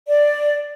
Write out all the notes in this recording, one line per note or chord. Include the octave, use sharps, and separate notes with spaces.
D5